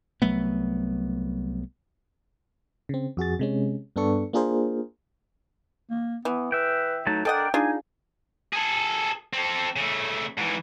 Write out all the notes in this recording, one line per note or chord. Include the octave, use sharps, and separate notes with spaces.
C2 F#3 A3 B3
C#3 C4
F2 F#4 G#4 A6
C3 G#3 C#4
G2 B3 D4 A4 C#6
A#3 D4 F4 G#4 A#4 C5
A#3
E3 B3
B4 E5 G5
F#3 A3 D#4 A5
D4 A4 A#4 D5 D#5 F#5 G5
D4 D#4 F4 G#4 G#5
G#4 A4
C4 A4
C#3 A3
G#2 E3